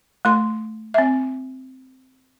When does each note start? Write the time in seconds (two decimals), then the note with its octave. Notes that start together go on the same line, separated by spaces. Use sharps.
0.25 A3 C6
0.94 C4 E5